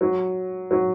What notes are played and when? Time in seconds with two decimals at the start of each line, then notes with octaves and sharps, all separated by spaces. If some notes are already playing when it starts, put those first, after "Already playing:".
0.01 F#3
0.71 F#3